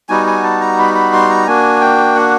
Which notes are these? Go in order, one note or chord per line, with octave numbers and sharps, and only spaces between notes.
G3 B3 D#4 F#4 G#5
G#5
A5
A#5
B5
B5
C6
A#5
A#3 D4 F#4 G#5
G5
F#5